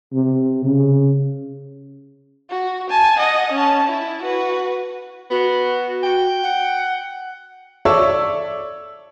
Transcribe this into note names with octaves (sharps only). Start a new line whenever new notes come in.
C3
C#3
F#4
G#5 A5
D#5 F#5
C#4 A5
E4
F#4 B4
B3 F#4
G5
F#5
A4 C#5 D5 E5 C#6 E6